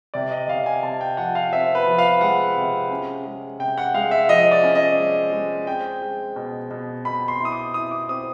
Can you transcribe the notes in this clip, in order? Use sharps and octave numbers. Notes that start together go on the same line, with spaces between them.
C3 D5
D#5
C3 F5
G#5
C3 A5
G5
F3 F#5
F5
C4 E5
B4
F3
F5
G#3 F#5
C3
C#4
G#3
C3 G5
F#5
G#3 F5
E5
F3 D#5
D5
C#4
D#5
G#3
G#3
C4 G5
G#3
B2
B2
B2 B5
C6
E4
D#6
D6
E4 D#6
D6
C4 D#6